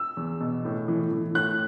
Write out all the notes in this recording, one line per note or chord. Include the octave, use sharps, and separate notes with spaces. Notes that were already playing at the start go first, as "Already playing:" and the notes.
Already playing: E6
E2
B2
A2
E3
E3
A2 F#6